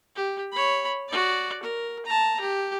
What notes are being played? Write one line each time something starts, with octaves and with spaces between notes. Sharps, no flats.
G4
C#5 B5
F#4 D5
A#4
A5 A#5
G4